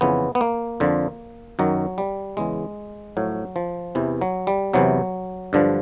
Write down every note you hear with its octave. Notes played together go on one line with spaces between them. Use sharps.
F2 C#3 E3 B3
B3
A#3
F2 D3 F3
F#2 D#3 F#3
G3
E2 C#3 E3 G#3
A2 F3 F#3
F3
E2 C3 E3
F#3
G3
E2 C3 E3 F#3
G2 D3 F3